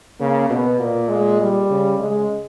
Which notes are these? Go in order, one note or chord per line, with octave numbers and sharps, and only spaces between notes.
C#3 A#3
B2 B3
A#2 A#3
G#3
G3
C#3
C#3 G#3